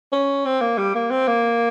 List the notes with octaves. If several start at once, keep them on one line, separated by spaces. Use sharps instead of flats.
C#4
C4
A#3
G3
A#3
C4
A#3